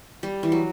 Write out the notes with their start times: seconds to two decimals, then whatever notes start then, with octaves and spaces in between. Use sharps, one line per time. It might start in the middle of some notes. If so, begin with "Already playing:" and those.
0.23 G3
0.43 E3
0.52 F#3